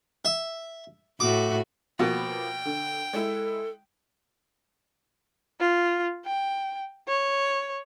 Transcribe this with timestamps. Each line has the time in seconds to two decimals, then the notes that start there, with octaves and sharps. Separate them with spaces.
0.25 E5
1.20 A2 A3 F#4 D6
1.99 B2 F3 A#3 B3 G5
2.65 D3
3.13 G#3 E4 A4
5.60 F4
6.26 G5
7.08 C#5